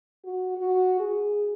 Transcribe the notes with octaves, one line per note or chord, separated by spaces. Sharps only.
F#4
F#4
G#4